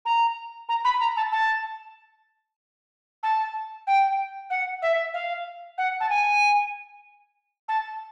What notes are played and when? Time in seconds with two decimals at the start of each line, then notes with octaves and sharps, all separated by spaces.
0.05 A#5
0.68 A#5
0.84 B5
1.00 A#5
1.16 A5
1.32 A5
3.23 A5
3.87 G5
4.50 F#5
4.82 E5
5.13 F5
5.77 F#5
6.00 A5
6.09 G#5
7.68 A5